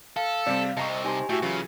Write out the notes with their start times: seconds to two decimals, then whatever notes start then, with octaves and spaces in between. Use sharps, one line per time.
0.17 A4 F5
0.46 C3 G3 C4 D5
0.77 C2 C3 D#5 A5 A#5 C#6
1.05 D#4 G4 C5 G#5
1.29 A2 E4 F#4 E5 G5
1.42 C#3 E3 F#3 F4